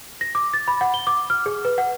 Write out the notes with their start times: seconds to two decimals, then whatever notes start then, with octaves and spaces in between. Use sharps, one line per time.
0.21 A#6
0.35 D6
0.54 A6
0.68 B5
0.81 F#5
0.94 G7
1.07 D6
1.30 F6
1.46 G#4
1.65 B4
1.78 F#5